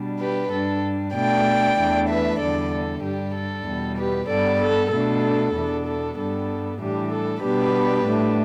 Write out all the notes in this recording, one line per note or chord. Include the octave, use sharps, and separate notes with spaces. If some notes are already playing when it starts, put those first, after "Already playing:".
Already playing: B2 G3 D4
G4 B4
G2 G3 D4 A4
B2 A3 D4 D5 G5
E2 E3 A3 D4
B4 E5
E2 D3 G3 A4 D5
A4
G2 G3 D4 G4
A4
E2 B2 G3
G4 B4
G2 G3 B3 A4 D5
A4
B2 A3 D4 A4
E2 B2 B3 D4
A4
G2 G3 B3 D4 A4
A2 E3 G3 D4 G4
A4
B2 G3 B3 D4 G4 B4
A2 A3 D4